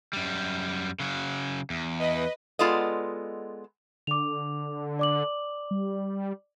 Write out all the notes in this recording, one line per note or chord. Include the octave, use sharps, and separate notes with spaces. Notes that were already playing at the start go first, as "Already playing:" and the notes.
F#2 G3
C#3 F#3
E2
B4 D#5
G#3 B3 F4 A4 D5 D#5
D3 D6 F7
D5 D6 F#7
G3